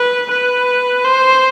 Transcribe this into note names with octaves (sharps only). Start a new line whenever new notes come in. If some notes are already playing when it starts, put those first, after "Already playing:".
Already playing: B4
B4
C5